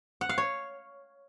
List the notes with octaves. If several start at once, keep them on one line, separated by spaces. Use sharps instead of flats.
F#5
F5
C#5